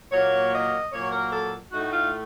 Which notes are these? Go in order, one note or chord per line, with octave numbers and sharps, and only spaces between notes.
A#2 F#3 A#3 C#5
D#5
A#2 F#3 A#3 C#5
A#4
A4
A2 A3 D#4 F#4
F4